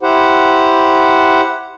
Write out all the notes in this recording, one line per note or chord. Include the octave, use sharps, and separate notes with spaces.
E4 G4 C5 F#5